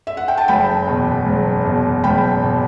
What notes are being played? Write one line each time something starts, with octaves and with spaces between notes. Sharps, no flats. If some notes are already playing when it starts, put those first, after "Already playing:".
E5
F#5
G5
A5
F#1 G5 B5
E2 B2
F#1
E2 B2
F#1 G5 B5
B2